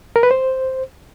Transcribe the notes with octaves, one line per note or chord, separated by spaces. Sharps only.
A#4
B4
C5